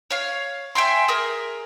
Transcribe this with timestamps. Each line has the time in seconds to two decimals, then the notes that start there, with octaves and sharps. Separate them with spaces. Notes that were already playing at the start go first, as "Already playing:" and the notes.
0.11 C#5 F5
0.75 E5 G5 G#5 C6
1.08 G#4 A#4